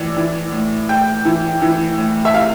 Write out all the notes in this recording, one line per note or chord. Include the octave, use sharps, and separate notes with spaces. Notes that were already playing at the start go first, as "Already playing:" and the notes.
Already playing: A2 E3 D5
E3
A2
A2 G5
E3
E3
A2
E5
C3 F5